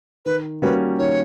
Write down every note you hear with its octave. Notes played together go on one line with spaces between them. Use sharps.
D#3 B4
G3 A#3 C#4 F#4 B4
D#3 C#5